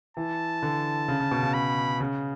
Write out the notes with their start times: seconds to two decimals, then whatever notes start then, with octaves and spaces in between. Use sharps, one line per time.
0.17 E3 A5
0.63 D3
1.08 C#3
1.20 C#3
1.31 B2
1.43 C#3
1.54 C#3 B5
2.00 C#3